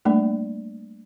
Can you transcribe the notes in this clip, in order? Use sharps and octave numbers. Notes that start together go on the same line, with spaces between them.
G3 A3 A#3 D4 D5